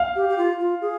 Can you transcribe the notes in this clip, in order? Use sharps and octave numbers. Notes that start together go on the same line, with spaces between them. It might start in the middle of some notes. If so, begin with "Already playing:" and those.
Already playing: F5
G4
G4
F4
F4
G#4